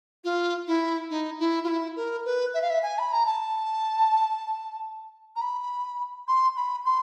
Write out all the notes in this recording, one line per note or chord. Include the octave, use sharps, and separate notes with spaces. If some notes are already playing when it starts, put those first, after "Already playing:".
F4
E4
D#4
E4
F4
E4
A#4
B4
E5
F5
E5
G#5
B5
A#5
A5
A#5
B5
C6
B5
C6